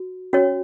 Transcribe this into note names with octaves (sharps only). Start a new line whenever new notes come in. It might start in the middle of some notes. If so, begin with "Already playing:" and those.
Already playing: F#4
C#4 F#4 C#5